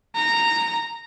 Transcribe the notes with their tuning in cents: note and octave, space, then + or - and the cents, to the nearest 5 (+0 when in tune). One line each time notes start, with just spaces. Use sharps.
A#5 -10